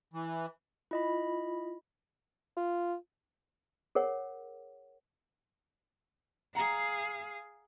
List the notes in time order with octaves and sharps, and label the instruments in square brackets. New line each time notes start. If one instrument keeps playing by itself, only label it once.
[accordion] E3
[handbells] E4 D#5 B5 [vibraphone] F4
[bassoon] F4
[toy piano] G#4 A#4 C#5 F#5
[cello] G#4 F5 [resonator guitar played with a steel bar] F#5 A#5